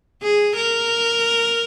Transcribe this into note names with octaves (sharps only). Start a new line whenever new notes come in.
G#4
A#4